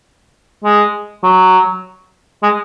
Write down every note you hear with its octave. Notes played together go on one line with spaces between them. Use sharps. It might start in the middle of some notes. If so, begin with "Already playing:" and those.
G#3
F#3
G#3